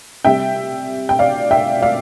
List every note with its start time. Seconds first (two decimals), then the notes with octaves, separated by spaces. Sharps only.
0.24 C3 G3 E5 G5
1.09 G5
1.19 D5 F5
1.51 E5 G5
1.82 D5 F5